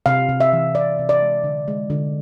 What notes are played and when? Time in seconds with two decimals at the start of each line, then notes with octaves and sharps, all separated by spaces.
0.06 C3 F5
0.29 C3
0.40 E5
0.53 E3
0.75 C3 D5
0.99 C3
1.09 D5
1.22 G#3
1.44 D3
1.68 G#3
1.90 D3